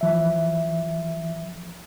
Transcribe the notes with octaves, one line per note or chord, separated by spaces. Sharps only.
E3 F3 E5